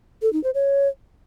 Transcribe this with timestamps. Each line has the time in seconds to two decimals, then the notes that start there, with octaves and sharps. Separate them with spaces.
0.22 A4
0.33 D#4
0.44 C5
0.54 C#5